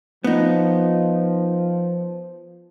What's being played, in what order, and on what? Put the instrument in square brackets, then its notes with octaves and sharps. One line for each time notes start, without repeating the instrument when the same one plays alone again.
[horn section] F3 [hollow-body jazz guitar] B3 D#4